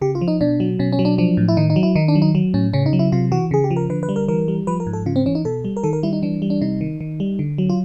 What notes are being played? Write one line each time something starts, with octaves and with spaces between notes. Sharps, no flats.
C#3 G4
F4
F3
D#4
B2 D4
F#3
B2 C#4
C#4
F#3
D4
F3 D4
A2
E4
D#3 D#4
D#4
F#3
E4
D#3 D#4
D4
F#3
D#4
F#3
A2 C#4
C#3 C#4
D#4
F#3
E4
C3 F4
E3 F#4
C#3 G#4
G4
F3
A#4
D3 B4
B4
G3
A#4
E3 A#4
G3
F3 B4
A#4
G#2
A4
C#3 F4
C4
E3 C#4
D#4
B2 A4
G3
A#4
D#3 A4
A#4
G3 E4
D#4
E3 D4
G3
D4
C3 D#4
D#3
D#3
G3
D3
F#3
F4